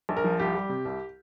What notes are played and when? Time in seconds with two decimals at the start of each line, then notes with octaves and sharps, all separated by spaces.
0.09 A#1
0.17 A#4
0.24 F3
0.39 C2 G4
0.55 G3
0.69 C3
0.85 C2